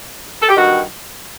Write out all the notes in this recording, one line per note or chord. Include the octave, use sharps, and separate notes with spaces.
A4
G4
G2 D#3 F#4